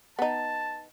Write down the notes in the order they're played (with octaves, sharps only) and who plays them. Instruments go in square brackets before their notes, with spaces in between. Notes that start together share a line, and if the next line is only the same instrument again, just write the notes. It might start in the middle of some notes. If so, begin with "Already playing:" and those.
[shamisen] B3 D#4 [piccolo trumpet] A5